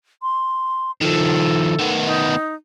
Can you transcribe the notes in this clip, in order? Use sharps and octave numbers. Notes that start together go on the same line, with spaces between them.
C6
D#3 F3 A4
D#3 B3
D#4